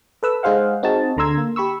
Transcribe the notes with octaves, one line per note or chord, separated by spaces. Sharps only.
A4 B4 E6
G#3 D#4 G#4 C5 F5 F#5
C4 D#4 F#4 G#4 A5
D2 D3 A#5 C6 E6 G#6
A#3
G4 B5 C#6 E6